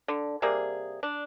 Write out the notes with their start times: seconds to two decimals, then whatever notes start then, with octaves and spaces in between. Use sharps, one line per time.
0.08 D3
0.42 C3 G3 A#3 G#4
1.03 D4